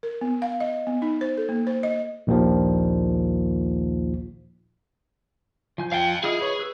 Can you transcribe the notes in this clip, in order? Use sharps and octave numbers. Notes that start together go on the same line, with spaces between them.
A#4
B3
F5
D#5
B3
D#4
C5
A4
A#3
C5
D#5
A#1 D#2 A#2 D#3 F3
F3 G#5 G6
F5 G5
E4 F4 G#4 D#5
B4 C#5 B5
B4 E6